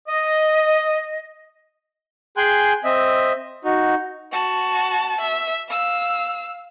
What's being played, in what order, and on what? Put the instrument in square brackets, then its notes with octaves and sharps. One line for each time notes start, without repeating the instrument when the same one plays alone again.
[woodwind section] D#5
[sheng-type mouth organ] G#4 G5 G#5 C6 F#6
C4 D#5 E5
D#4 F#4
[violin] F#4 A5
E5
F5 E6